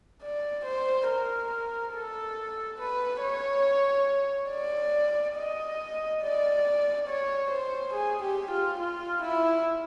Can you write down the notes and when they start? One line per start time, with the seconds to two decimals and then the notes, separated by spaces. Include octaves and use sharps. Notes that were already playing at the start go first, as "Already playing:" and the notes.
0.22 D5
0.65 C5
1.08 A#4
1.94 A4
2.79 B4
3.22 C#5
4.50 D5
5.36 D#5
6.22 D5
7.08 C#5
7.50 C5
7.94 G#4
8.22 G4
8.51 F4
8.79 F4
9.22 E4